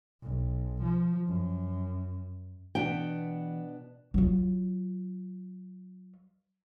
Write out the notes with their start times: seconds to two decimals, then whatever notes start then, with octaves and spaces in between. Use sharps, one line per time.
0.22 B1
0.83 F3
1.28 F#2
2.75 B2 E3 B3 D4 G5
4.14 F#3 F4